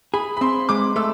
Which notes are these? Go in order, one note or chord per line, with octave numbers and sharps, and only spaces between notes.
G#4 B5
B5
C4 C6
G#3 D6
A3 E6